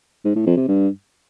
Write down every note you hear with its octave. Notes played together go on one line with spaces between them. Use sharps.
G#2
A2
F2
C3
G2